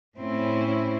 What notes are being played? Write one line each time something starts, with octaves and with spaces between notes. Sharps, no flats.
A2 C4 C#4 E4